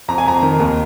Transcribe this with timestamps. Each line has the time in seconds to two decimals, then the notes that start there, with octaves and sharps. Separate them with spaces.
0.08 F2 A#5
0.18 G#5
0.26 F2 A#5
0.43 D#3
0.60 D#2